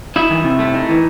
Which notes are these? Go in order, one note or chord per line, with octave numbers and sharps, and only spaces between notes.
D#4 E4 E5
E3
C3
A3
D#4
E3